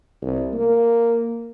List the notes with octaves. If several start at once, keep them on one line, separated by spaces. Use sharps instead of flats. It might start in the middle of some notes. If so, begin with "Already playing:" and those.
C2
A#3